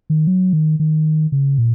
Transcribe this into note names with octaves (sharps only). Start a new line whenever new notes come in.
D#3
F#3
D#3
D#3
C#3
A#2